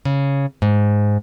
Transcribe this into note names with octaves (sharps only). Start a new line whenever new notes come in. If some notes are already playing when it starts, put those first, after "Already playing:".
C#3
G#2